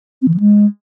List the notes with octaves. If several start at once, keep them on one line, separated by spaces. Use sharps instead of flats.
C4
E3
F3
G#3